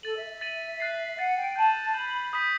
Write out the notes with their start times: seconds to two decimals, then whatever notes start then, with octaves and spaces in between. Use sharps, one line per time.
0.03 A4 A6 D#7 F#7
0.17 E5
0.29 E5
0.41 A6 D#7 F#7
0.80 F#6 A6 C7 D#7
1.18 F#5 F#6 A6 C7 D#7
1.37 G5
1.56 A5 G6 D#7 F#7
1.94 B5 G6 D#7 F#7
2.33 D#6 G6 B6 D#7